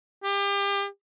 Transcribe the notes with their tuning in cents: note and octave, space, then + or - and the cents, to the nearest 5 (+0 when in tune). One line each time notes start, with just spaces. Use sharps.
G4 +35